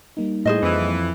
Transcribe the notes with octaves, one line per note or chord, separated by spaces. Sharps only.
G3 A#3 D#4
A2 G#4 C5 D#5
F2 E3